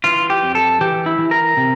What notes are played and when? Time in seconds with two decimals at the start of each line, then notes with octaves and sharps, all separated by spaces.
0.04 E3 F4
0.30 G4
0.43 F2
0.55 A4
0.81 E3 G4
1.06 E4
1.18 E3
1.31 A#4
1.57 C3